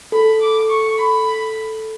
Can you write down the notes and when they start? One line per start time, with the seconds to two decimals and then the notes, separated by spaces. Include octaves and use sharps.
0.12 A4 B5
0.41 D6
0.69 C#6
0.98 B5